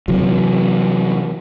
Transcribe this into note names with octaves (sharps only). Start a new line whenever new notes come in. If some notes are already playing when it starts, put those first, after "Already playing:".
C3 E3 F#3